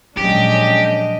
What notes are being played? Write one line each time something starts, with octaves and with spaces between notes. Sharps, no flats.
A#2 F3 F#3 G#3 C#4 D4 G4 D#5